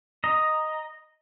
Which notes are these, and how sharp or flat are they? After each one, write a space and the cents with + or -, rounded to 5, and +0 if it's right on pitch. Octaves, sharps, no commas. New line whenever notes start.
D#5 +0 A#5 +10